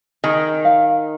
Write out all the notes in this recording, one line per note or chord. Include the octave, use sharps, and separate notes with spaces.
D#3 G#4
F5